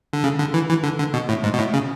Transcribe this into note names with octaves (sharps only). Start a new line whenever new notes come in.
D3
C#3
D3
E3
E3
D3
D3
B2
A2
G#2
B2
A2
C#3